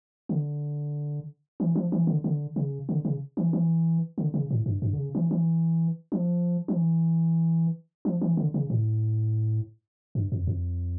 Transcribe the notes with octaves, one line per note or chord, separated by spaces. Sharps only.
D3
E3
F3
E3
D3
D3
C#3
D3
C#3
E3
E3
D3
C#3
A2
G2
G2
D3
C#3
E3
E3
F3
F3
E3
F3
E3
D3
C#3
A2
G2
F2
F2